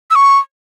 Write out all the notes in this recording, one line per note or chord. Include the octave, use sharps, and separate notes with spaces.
E6
C#6